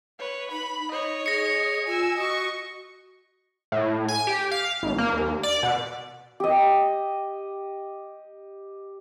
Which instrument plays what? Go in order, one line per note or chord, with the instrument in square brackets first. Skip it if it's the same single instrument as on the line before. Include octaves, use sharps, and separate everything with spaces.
[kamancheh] B4 C#5
[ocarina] D#4 [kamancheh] B5
[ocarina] D#4 [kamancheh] C#5 D#5
[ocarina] G#4 [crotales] A#6 C#7
[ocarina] F4 [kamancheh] G#5 E6
[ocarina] F#4 [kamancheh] D#5 C#6
[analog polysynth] A2
G#5
G4
F5
G#1
A#3
D#2
D5
B2
[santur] G4 D#5